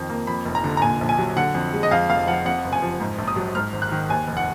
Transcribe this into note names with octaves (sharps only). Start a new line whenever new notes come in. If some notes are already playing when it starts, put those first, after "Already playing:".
Already playing: F2 D#3
A#3
F2 B5
F1
A#5
D3
A#5
A#2 G#5
A#1
G#5
F#3
D3 F#5
F2
G#3
D#5
F2 F5
F1 F5
F3 F#5
F2 F#5
F#1
G#5
F3
G#2
A#1
D#6
F#3
G#2 F6
G#1
F#6
D#3
D#2 G#5
F1
F#5